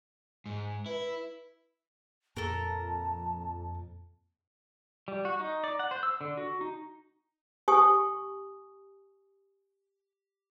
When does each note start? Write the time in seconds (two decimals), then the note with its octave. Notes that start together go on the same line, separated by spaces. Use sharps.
0.46 G#2
0.86 E4 B4
2.37 F2 A#2 A4 A#4 A5
5.08 G3
5.25 F#4
5.39 D#4
5.64 D5
5.79 F#5
5.91 C5
6.03 E6
6.21 D3
6.37 F#4
6.61 D#4
7.68 G4 G#5 C#6 D#6